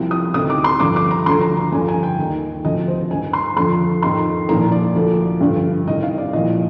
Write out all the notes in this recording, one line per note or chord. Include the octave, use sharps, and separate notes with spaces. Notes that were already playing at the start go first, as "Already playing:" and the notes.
Already playing: C2 C3 F3
D#6
D2 C3 D#3 D#6
D6
C6
G2 D3 F3 D6
D6
A#5
D2 D3 F3 C6
A#5
A#5
G2 D3 F3 G#5
G#5
G5
D#2 D#3
D2 C3 F3 D#5
C5
G2 D#3 G#5
C6
F2 D3 F3 C6
F2 D#3 C6
C2 A#2 F3 A#5
D5
D2 D3 F3
G2 D3 F3
C2 C3 D#3 D#5
F5
D5
C2 A#2 F3 D#5